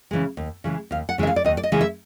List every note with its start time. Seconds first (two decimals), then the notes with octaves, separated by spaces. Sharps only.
0.11 C#3 E3 G#3
0.37 D#2
0.64 C#3 E3 G#3
0.91 D#2 F5
1.09 F#5
1.18 C#3 E3 G#3 E5
1.27 F5
1.36 D5
1.44 D#2 D#5
1.57 D5
1.63 D#5
1.72 C#3 E3 G#3
1.81 E5